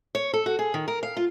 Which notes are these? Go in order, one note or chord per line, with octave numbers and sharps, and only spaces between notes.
C#5
A4
F#4
G#4
D#3
A#4
F5
F4